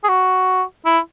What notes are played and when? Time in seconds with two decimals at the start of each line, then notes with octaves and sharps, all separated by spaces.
0.04 G#4
0.09 F#4
0.85 E4